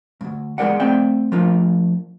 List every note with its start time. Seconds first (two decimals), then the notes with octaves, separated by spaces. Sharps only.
0.21 D2 G2
0.58 E2 G#3 E4 A#4 D5 F#5
0.80 A3 C4 D5 E5 G5
1.32 F3 A3 A#3 D4 F4